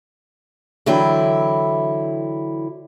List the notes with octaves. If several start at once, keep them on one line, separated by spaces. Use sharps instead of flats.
D3 E3 F#3 E4 G5